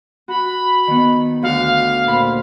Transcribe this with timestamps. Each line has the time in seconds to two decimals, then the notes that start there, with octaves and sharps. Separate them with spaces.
0.28 F#4 B5
0.87 D#3 B3
1.42 D2 F#4 F5 F#5
2.07 A#2 C5 B5